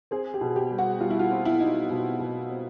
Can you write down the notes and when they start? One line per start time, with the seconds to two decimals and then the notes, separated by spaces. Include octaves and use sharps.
0.11 C4 G#4
0.34 G4
0.41 B2
0.56 G4
0.71 G3
0.78 F#4
1.00 G3 F4
1.10 E4
1.19 F4
1.31 C4
1.45 E4
1.60 D#4
1.90 B2
2.20 B2
2.49 C4